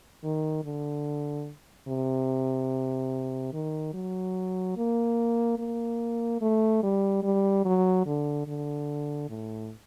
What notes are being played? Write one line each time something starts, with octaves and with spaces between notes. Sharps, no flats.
D#3
D3
C3
D#3
F#3
A#3
A#3
A3
G3
G3
F#3
D3
D3
A2